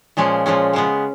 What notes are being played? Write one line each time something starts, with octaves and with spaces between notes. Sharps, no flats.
A#2 F3 G#3 C#4
A#2 F3 G#3 C#4
C#3 G#3 B3